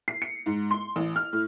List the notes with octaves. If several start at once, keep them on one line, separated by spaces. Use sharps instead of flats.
C7
C#7
G#2
C6
A1
F6
A2